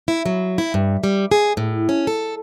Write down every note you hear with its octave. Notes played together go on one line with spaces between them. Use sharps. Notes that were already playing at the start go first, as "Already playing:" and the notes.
E4
F#3
E4
G2
G3
G#4
A2
C#4
A4